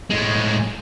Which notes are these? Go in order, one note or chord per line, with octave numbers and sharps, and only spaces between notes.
A2 G#3